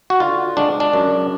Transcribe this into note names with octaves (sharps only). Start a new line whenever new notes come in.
F#4
D3 F4
G#3 D4
D4
F#2